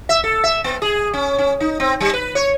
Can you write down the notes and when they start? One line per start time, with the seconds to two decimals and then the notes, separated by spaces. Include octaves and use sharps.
0.09 E5
0.24 A4
0.44 E5
0.64 B3
0.82 G#4
1.13 C#4
1.38 C#4
1.60 D#4
1.80 C4
2.00 G3
2.13 B4
2.35 C#5